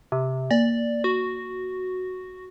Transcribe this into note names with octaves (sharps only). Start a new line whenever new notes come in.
C3
A#3 D5
F#4